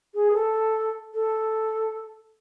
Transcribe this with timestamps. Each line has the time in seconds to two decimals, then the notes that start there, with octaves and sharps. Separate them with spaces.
0.14 G#4
0.31 B4
0.34 A4
1.14 A4